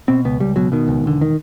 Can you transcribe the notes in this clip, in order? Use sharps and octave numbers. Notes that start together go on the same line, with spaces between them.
B2 C4
C#2 B3
C#2 G3
B2 F#3
B2 D#3
C#2
E1 D3
D#3